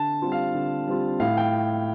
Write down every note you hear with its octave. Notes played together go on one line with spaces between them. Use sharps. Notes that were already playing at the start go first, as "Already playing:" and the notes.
Already playing: D3 A5
G3 C4 F4
F5
D3
G3 C4 F4
A2 F5
G5